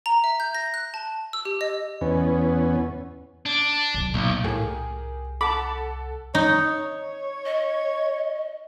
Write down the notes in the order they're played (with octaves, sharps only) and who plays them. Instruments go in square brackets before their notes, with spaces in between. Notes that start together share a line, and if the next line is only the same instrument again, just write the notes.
[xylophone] A#5
E5
G6
A#6
F#6
A5
E6
G4
D#5
[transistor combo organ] E2 B3 C#4
[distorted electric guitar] D4
[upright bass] C2 F#3
[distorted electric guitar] B1 [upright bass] A#2
[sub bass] C2 [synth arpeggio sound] A2 [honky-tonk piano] G4 G#4 A#4
[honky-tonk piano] A4 F#5 A5 [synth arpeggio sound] B5 [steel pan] D6
[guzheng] D#4 [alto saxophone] C#5
[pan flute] D#5